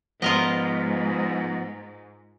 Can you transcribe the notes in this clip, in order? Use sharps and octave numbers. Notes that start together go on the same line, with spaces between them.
G#2 F3 B3 F4 A#4 D#5